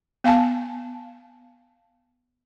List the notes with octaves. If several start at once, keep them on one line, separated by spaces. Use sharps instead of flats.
B3 F5 G#5 A5